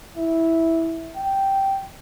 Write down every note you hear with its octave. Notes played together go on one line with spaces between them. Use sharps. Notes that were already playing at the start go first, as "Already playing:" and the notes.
E4
G5